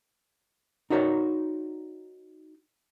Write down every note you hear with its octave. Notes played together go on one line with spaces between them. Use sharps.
D#4 F#4 A#4 C#5 D5